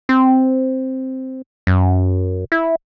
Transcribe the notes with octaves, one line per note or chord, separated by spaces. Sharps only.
C4
F#2
E4